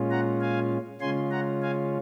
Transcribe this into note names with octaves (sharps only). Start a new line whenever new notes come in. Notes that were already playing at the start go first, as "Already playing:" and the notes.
Already playing: A#2 G#3 C#4 F4
F#5 A#5
F5 G#5
C#3 G#3 C#4 F4 G#5 C6
F#5 A#5
F5 G#5